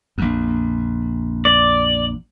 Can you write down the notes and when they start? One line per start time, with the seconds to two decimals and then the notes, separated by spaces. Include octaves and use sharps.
0.18 A#1 F2
1.45 D5